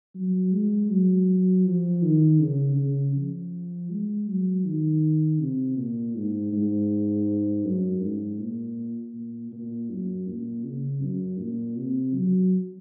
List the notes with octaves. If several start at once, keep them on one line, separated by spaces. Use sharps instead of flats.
F#3
G#3
F#3
F3
D#3
C#3
C#3
F3
G#3
F#3
D#3
C3
A#2
G#2
G#2
F#2
G#2
A#2
A#2
A#2
F#2
A#2
C#3
F#2
A#2
C3
F#3